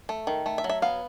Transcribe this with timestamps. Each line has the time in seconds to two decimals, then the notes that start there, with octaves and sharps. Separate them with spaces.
0.09 A3
0.27 D#3
0.46 A3
0.58 E5
0.64 F#3
0.69 E5
0.82 B3 F5